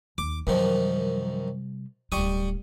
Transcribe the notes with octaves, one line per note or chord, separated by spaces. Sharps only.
D#2 D6
F#2 C3 D#3 F3 G3
D1 G3 F4 C#6 D#6